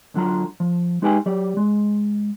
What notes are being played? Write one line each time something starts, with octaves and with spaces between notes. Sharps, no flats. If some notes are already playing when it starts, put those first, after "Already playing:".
D2 D3 F#3 F4 A#5
F3
G#3 D#4 G4 B4 G5 G#5
F#3 G4 D5
G#3